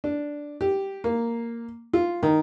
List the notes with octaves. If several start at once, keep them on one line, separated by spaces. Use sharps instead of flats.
D4
G4
A#3
F4
D#3